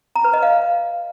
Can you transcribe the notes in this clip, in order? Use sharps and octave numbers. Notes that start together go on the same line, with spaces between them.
A#5
B4
D#5
F5